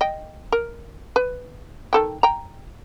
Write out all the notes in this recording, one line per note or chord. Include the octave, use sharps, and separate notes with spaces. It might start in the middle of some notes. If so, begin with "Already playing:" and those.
D#5 G5
A#4
B4
D#3 A4 G5
G5 A#5